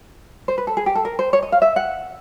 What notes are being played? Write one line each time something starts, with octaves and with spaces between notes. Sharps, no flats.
C5
B4
A4
G#4
G4
A4
A#4
C5
C#5
D#5
F5
E5
F#5